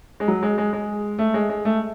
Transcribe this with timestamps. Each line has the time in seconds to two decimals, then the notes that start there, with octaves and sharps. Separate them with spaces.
0.20 G#3
0.28 F#3
0.43 G#3
0.58 G#3
0.73 G#3
1.19 A3
1.34 G#3
1.49 G#3
1.65 A3